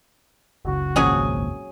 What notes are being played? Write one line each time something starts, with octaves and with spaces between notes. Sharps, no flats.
F#1 C#2 C#3 F#4
G#1 A#2 F3 F#3 C#4 G#4